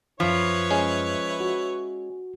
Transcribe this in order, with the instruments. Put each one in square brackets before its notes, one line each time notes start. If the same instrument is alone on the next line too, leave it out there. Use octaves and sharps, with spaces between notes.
[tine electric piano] F#2 B6 [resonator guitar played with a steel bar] F3 [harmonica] E4 B4 C#5
[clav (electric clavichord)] G#3 C#4
[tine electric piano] F#4